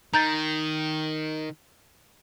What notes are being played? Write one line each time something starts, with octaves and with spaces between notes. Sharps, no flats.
D#3 A#5 G6 A6